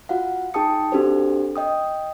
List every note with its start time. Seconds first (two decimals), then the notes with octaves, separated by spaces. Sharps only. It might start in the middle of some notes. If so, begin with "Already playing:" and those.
0.09 F4 F#4 F5 F#5
0.54 D#4 G#4 G5 A5 D#6 C#7
0.92 C4 D4 F#4 G4 A4 C5
1.56 D#5 G5 D#6